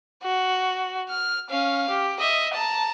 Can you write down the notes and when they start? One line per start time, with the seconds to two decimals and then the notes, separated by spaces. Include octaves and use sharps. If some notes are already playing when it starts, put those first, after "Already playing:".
0.23 F#4
1.10 F6
1.50 C#4 F5
1.89 G4
2.19 D#5 E5
2.54 A5 A#5